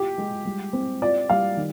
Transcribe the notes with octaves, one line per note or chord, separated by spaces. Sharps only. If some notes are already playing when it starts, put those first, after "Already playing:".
Already playing: F4 G4
G#3
G3
C4
F4 D5
G3 F5
D#3